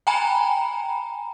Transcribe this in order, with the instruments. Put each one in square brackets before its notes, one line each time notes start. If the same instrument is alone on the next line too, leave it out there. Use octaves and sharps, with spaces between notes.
[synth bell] G5 G#5 A#5 B5